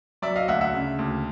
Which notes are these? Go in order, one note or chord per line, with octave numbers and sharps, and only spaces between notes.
F#3 D5 E5
D#5 F5
D2 E5 F#5
E5 F#5
C#3
D2